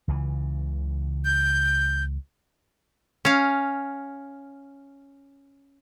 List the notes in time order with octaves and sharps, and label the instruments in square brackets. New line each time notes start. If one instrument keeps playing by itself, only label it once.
[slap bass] C#2 C#3 E3
[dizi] G6
[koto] C#4 F5